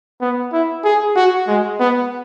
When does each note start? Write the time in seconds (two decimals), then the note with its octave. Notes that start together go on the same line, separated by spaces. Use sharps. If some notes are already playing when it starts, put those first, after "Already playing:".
0.21 B3
0.53 E4
0.85 G#4
1.16 F#4
1.48 G#3
1.79 B3